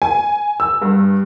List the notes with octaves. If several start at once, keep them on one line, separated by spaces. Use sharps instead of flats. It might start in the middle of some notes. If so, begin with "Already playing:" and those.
G#5
E6
G2